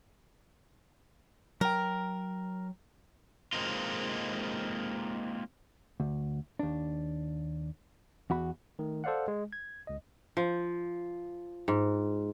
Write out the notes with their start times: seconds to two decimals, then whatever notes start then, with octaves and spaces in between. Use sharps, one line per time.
1.61 F#3 A#4 G5
3.53 G#3 A#3 C4 D#4 F4
6.00 D2
6.59 D#2 D4
8.30 E2 F#4 B5
8.79 D#3 A3
9.04 A4 C5 D5 F5 F#5
9.28 G#3
9.53 G#6
9.87 C#2 D#5
10.37 F3
11.68 G#2